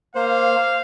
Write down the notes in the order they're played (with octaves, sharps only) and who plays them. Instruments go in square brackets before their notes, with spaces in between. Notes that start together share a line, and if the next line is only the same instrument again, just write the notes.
[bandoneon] A#3 C5 [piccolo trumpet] F5